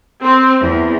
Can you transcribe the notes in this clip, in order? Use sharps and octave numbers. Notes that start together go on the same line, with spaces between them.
C4
E2